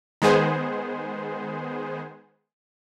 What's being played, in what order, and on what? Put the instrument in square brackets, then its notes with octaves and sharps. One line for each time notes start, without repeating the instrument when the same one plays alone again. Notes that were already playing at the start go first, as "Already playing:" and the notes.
[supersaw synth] D#3 G#3 B3 G#4 C5